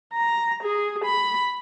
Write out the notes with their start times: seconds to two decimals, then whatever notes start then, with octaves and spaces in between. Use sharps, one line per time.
0.14 A#5
0.63 G#4
1.04 B5